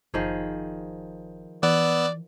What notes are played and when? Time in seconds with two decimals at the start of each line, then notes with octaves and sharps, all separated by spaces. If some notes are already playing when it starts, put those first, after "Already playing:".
0.14 F#1 D#3 F3 G#4
1.63 E3 B3 D5 E6 F#6